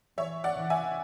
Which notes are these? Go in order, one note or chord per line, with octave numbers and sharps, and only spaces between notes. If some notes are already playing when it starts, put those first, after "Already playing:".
E3 C#5 E5
D5 F#5
E3
E5 G#5